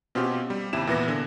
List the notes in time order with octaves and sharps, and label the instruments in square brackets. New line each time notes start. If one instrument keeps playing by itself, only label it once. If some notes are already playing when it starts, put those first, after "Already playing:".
[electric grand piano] B2 C4 C#4 F4 G4
G3
D#2 C3 E4 E7
A#2 E3 B3 A#6
D3